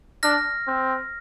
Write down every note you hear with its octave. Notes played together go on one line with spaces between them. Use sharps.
D4 F6 A#6
C4